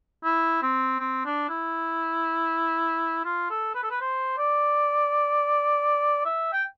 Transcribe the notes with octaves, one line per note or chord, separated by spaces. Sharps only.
E4
C4
C4
D4
E4
F4
A4
B4
A4
B4
C5
D5
E5
G5